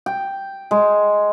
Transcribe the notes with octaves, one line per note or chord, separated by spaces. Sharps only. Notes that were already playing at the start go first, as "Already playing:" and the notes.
G5
G#3